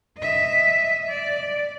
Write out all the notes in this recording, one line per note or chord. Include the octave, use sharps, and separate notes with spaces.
D#5 E5
D5